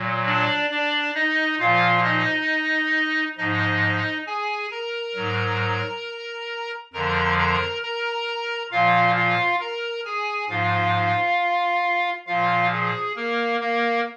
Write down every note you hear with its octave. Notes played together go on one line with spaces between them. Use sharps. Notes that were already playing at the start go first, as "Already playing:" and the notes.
Already playing: A#2 F#3
D4 D5
D4 D5
D#4 D#5
A#2 F3 F4 F5
D#4 D#5
G#2 F3 D#4 D#5
G#4 G#5
A#4 A#5
G#2 F#3
F2 D3 F3 A#4 A#5
A#4 A#5
A#4 A#5
A#2 F3 F4 F5
F4 F5
A#4 A#5
G#4 G#5
G#2 F3 F4 F5
A#2 F3 F4 F5
G#4
A#3 A#4
A#3 A#4